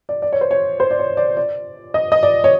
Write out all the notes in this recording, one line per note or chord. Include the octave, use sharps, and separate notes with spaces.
D5
D5
C#5
C5
C#5
C5
D5
C#5
D5
D5
D#5
D#5
D5
C#5